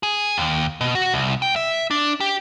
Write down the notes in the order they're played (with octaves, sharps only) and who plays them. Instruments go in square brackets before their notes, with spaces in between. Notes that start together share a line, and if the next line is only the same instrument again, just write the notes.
[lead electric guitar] G#4
D#2
B2
F#4
C2
G5
E5
D4
G4